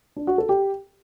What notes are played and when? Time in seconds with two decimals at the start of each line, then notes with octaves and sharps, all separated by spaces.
0.16 D4
0.27 F#4
0.38 A4
0.49 G4